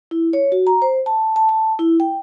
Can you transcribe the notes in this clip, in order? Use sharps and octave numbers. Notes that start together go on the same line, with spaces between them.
E4
C#5
F#4
A#5
C5
A5
A5
A5
E4
G5